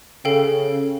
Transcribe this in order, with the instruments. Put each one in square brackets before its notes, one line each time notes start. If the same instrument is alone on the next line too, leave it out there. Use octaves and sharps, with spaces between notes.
[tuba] C#3 [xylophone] A4 F5 G5